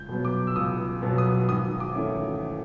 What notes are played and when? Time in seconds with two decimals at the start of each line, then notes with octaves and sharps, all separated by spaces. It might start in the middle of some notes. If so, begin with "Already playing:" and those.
Already playing: C#2 G6
0.09 B2 F#3 B3
0.25 D6
0.47 E6
0.56 C#2 D#6
1.02 B2 F#3 B3
1.18 D#6
1.49 G#1 D#6
1.80 D6
1.95 E3 A3 C#4